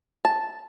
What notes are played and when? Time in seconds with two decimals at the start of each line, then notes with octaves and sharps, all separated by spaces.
0.25 A5